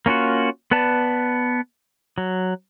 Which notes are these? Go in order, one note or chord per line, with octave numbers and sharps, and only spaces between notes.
A#3 C#4 F4 F#4
B3 B4 D5 A5
F#3